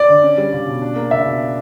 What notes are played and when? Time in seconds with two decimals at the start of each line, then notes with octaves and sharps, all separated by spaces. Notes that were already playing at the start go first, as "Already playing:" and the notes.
Already playing: D5
0.08 D3
0.23 C#4
0.38 G3
0.52 C#2
0.66 B2
0.82 D4
0.96 A#3
1.11 C#2 E5
1.25 B2